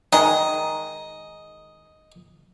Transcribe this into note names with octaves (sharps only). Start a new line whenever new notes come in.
D#3 G#3 D#5